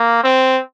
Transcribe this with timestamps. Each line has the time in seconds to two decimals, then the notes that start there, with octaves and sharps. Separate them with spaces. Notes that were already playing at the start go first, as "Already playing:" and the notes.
Already playing: A#3
0.24 C4